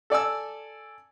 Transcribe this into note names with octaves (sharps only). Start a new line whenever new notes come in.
A4 D5 G#5 E6